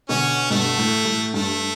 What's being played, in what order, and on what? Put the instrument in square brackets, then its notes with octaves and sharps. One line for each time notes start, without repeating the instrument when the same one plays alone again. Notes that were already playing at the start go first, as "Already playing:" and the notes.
[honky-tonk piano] B2 D3 [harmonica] C#4
[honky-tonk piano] G2 B2 [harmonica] A3
[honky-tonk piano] A2
A2
[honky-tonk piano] G2 [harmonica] A3